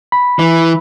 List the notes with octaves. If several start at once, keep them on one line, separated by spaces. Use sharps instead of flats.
B5
E3